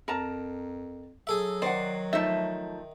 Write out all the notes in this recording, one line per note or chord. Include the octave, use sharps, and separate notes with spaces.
F2 A#4 A5 A#5
F#3 G#4 A4 E5
D#3 C5 D5 F#5
F3 A3 D#4 E5